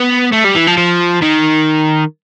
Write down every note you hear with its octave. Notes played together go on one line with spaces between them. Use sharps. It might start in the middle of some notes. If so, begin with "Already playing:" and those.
Already playing: B3
A3
G3
E3
F3
F3
D#3